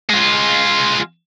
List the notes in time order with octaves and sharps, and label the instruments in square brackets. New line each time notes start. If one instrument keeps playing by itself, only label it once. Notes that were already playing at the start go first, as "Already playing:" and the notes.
[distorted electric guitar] G#3 F4